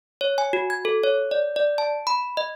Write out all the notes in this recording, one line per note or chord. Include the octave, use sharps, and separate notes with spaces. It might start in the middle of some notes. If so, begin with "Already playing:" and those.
C#5
G#5
F#4
G#6
A4
C#5
D5
D5
A5
B5
D#5